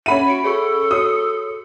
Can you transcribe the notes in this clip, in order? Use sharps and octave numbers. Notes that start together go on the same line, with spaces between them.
C#4 E5 F#5 B5 D#7
F#4 C#7 D7
G#4 A4 C#5 C#6
F#4 C#5 D#6 C#7